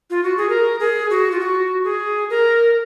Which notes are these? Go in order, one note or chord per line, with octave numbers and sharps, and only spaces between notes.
F4
F#4
G#4
A#4
G#4
F#4
F4
F#4
G#4
A#4